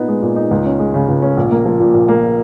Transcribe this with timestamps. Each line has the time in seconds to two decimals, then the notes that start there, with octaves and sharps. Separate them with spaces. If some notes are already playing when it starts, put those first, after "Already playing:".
Already playing: A#2 B3 D#4
0.08 G#3
0.22 A#2
0.36 D#4
0.51 C#2
0.66 C#4
0.79 G#3
0.94 C#3
1.08 C#2
1.22 C#4
1.37 A#1
1.51 A#3
1.66 F3
1.80 A#2
1.94 A#1
2.08 A#3